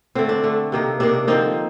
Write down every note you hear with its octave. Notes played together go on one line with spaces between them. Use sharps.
D3 A3 C4
D4
D3 A3
C3 D#3 A#3
C3 D#3 A#3 D4
D3 F3 A#3 C4 D#4